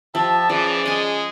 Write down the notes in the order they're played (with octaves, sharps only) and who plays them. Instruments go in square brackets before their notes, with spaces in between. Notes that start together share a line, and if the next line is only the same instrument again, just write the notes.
[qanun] F3 [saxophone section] G4 E5 [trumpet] A5
[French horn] E3 [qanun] F3 [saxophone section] C#4 G#4 [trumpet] D5
[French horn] G#3 [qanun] D#5 G#5